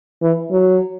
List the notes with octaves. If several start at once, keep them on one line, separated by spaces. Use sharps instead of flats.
E3
F#3